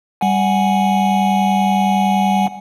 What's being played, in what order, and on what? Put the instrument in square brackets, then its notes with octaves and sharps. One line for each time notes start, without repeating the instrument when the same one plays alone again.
[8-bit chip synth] G3 F#5 G#5